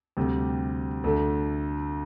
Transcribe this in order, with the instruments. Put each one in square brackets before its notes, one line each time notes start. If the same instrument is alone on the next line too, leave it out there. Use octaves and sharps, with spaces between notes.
[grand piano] D2 C3 G3
D2 D3 A3